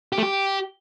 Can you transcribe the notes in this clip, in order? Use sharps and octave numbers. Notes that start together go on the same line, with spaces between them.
G4
A3
G4